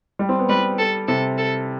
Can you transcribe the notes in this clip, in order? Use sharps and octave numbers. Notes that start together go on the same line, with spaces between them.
G3
C4
B3
G3 B4
A4
C3 A4
A4